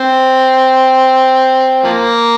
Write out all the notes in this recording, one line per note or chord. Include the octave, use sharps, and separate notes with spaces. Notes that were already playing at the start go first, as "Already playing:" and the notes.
Already playing: C4
F3 A#3